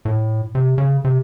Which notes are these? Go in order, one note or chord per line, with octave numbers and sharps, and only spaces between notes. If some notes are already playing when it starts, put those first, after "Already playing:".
A2
C3
C#3
C3